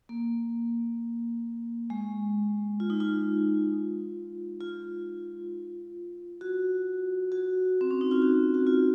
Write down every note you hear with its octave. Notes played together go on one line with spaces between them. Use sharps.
A#3
G#3
F4
D#4
F4
F4
F#4
F#4
C4
C#4
D#4
F4
F#4
F#4
F4